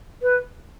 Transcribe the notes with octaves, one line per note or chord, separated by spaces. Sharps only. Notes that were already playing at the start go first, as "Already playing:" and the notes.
B4